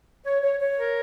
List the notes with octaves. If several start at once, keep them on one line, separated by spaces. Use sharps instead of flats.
C#5
C#5
C#5
A#4